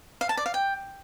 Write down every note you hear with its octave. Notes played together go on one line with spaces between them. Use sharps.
F5
A5
D5
F5
G5